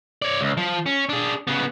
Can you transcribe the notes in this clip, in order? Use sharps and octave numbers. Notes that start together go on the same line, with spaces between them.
C#5 D5
C#2
F3
C#4
D4 G#4
C#3 B3